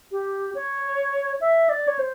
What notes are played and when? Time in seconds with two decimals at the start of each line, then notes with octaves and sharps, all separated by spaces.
0.12 G4
0.55 C#5
1.41 E5
1.69 D5
1.88 C#5
1.99 C5